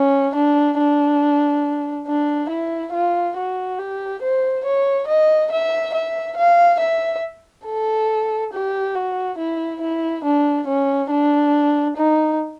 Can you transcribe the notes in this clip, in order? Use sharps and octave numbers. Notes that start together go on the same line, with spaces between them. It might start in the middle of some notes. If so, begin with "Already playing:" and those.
Already playing: C#4
D4
D4
D4
E4
F4
F#4
G4
C5
C#5
D#5
E5
E5
F5
E5
A4
G4
F#4
E4
E4
D4
C#4
D4
D#4